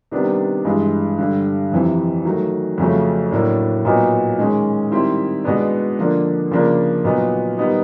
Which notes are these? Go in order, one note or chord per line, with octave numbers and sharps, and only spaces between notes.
C3 D#3 G3 B3 D4
G2 E3 G#3
G2 D3 G3
F2 C3 E3
D#3 F#3 A3
F2 C#3 F#3 A3 C#4
A2 F#3 A#3 D4
A#2 F#3 B3 D#4
D#3 G#3 C#4
D#3 G3 C4 E4
B2 G#3 B3 D4
D3 F3 A#3 D4
C#3 F3 A#3 D4
A#2 F#3 B3 D#4
D#3 G3 B3 D#4